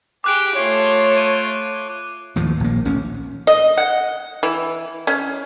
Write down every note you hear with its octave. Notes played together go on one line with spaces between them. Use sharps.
G4 G#4 D6 F#6 D7
A3 F4 C#5
D#7
D#2 A2 F3
A#1 A#3
A1 D2 C#4
D#5
F#5
E3
C#4